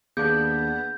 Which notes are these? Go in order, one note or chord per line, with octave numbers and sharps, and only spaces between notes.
D#2 B3 D4 G#4 F5 D6 G6